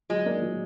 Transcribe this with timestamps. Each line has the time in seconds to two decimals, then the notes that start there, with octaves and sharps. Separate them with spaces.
0.10 F#3 G#3
0.25 A#3 D#4 A#4 D5
0.42 F#3